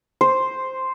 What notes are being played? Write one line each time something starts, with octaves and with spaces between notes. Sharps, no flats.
C5